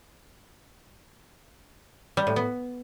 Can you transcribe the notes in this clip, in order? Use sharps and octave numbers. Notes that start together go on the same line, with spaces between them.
G3
A2
B3